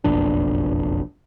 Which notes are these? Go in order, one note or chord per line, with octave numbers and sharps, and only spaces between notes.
F#1 B1 F2 D4